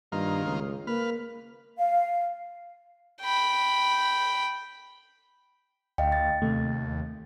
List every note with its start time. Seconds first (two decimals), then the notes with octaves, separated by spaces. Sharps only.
0.12 G2 D#3 A#3 F4
0.46 C#2
0.87 A#3 B4 F6
1.78 F5
3.21 G5 B5
5.98 D2 D#5 F5 G5
6.12 A6
6.42 D#2 C3 A3